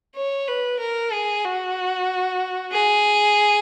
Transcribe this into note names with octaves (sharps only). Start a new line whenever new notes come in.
C#5
B4
A#4
G#4
F#4
G#4